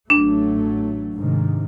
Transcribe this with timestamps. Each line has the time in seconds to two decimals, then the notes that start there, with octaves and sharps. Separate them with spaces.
0.10 A1 F#3 A3 D4
1.15 G#2 C3 D#3